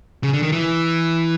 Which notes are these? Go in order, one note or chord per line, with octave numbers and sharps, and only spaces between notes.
C#3
D3
D#3
E3